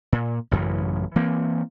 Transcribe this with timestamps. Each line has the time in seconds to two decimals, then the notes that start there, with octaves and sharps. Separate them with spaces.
0.12 A#2
0.51 A1 F#2 C#3 E3
1.16 E3 A#3 C4